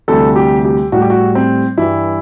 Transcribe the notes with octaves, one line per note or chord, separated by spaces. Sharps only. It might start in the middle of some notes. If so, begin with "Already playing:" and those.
D2 C3 E3 G3 A4
G4
G4
A2 G3 F#4
G4
F#4
C4
G2 E3 G3 E4